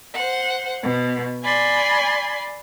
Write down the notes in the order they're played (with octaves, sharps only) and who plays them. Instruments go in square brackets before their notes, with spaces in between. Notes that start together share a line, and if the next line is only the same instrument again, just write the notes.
[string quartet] C5 F#5
B2
D5 G#5 B5 C6